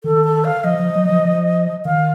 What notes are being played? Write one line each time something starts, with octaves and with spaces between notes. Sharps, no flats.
D#3 A4
A4
F5
F3 D#5
F3
F#3
F3
F3
D#3 F5